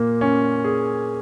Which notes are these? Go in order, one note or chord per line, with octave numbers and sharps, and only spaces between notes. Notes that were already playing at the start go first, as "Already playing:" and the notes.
Already playing: A#2 A#3
C#4
G#4